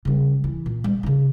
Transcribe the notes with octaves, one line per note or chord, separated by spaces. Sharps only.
C#3 G3
E3
A#2
G3
C#3 D#4